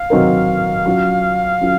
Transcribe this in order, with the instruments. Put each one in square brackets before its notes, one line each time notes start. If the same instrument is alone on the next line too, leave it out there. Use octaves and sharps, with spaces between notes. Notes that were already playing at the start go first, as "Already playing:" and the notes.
Already playing: [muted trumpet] F5
[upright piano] D#3 F#3 C4 D#4 A#4
F#3 C#4 F4
F#3 C#4 F4